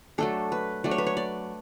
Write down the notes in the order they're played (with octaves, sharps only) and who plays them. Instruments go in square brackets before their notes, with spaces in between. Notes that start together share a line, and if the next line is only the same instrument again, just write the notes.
[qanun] F#3 A3 D4 A4
B4
F#3 A3 D4 D5
C#5
B4
C#5
D5